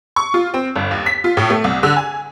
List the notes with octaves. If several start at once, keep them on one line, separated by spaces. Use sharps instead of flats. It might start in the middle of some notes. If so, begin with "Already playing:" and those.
C#6
F4
C4
G1
D#2
B6
F4
A2
A3
C2
D3
G#5